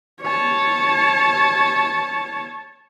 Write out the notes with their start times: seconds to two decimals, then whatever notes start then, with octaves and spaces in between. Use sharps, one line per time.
0.23 C#5 A5